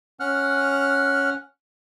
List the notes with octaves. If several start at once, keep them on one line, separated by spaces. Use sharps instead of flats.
C#4 F#5 F6 F#6